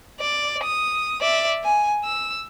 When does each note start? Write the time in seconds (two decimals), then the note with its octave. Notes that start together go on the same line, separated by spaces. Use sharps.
0.20 D5
0.65 D#6
1.21 D5 E5
1.64 G#5
2.04 E6